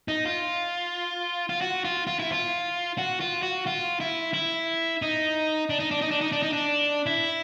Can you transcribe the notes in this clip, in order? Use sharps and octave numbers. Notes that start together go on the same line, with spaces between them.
D#4
F4
F4
F#4
F4
F4
E4
F4
F#4
F4
F#4
F4
E4
E4
D#4
D4
D#4
D4
D#4
D4
D#4
D4
D#4
D4
E4